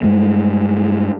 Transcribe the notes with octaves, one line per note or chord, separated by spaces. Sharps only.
G2 G#3 A3